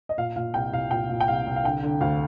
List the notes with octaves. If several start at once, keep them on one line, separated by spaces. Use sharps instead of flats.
D#5
A#2 F5
A#2 F5
C2 G5
C2 F5
A#2 G5
A#2
G5
C2 F5
C2
F5
D3 G5
D3
D2 F5